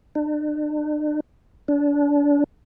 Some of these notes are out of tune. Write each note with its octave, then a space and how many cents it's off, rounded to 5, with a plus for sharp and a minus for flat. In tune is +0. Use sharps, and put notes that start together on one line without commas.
D4 +40
D4 -30